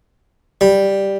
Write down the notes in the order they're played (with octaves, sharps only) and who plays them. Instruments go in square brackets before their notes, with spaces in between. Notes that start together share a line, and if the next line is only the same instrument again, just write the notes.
[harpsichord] G3